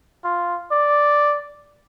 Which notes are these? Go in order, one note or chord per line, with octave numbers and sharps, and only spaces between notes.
F4
D5